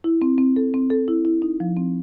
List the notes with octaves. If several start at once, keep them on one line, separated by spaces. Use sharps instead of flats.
E4
C4
C4
A4
C4
A4
E4
E4
D#4
F3
C4